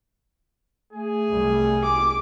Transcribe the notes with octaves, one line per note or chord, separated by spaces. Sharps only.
A3 G#4
C2 G3
D6